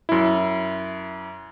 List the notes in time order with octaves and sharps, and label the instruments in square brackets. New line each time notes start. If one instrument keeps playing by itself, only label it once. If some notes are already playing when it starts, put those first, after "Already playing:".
[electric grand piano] F#2 E4